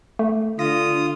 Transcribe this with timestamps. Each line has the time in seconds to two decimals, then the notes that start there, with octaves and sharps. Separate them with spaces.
0.19 A3
0.59 D3 F4 D#6 A#6